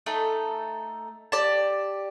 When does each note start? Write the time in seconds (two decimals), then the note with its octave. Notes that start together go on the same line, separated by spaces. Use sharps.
0.06 A3 D#4 A4
1.32 G4 D5 A5